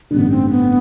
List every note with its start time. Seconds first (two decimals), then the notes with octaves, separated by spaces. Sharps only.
0.11 A1 G2 D3 B3
0.30 C4
0.50 B3